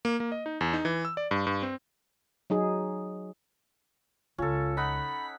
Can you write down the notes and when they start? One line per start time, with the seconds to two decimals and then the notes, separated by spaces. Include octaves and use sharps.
0.05 A#3
0.20 A#3
0.32 D#5
0.46 D#4
0.61 E2
0.73 D#4
0.85 E3
1.05 E6
1.17 D5
1.31 G2
1.47 G2
1.62 C4
2.50 F#3 D#4 G#4
4.38 C#2 C#4 F4 A4
4.77 D#4 F#5 B5 B6